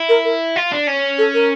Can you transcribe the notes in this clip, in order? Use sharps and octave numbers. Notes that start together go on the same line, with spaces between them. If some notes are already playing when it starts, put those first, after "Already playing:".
Already playing: E4
A#4
A#4
F4
D4
C#4
A4
A#4